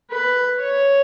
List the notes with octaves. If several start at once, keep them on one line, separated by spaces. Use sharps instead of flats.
B4
C#5